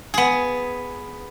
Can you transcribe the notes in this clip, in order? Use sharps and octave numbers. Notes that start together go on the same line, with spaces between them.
B3 G#4